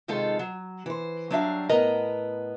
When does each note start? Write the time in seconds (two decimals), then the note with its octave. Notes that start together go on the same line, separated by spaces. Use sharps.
0.08 C3 D#3 G#3 D#4 F4 A4
0.39 F#3
0.86 E3 C5
1.30 F#3 G3 D4 F#4 E5 F5
1.69 A2 B3 A#4 D#5 A#5